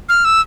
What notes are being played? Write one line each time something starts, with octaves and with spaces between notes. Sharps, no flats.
F6
E6